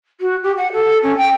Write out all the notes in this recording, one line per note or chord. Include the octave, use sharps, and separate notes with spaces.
F#4
G4
F#5
A4
C#4
G5